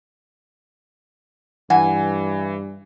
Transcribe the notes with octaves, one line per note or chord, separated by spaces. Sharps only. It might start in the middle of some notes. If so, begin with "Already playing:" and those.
G2 E3 F#5 G#5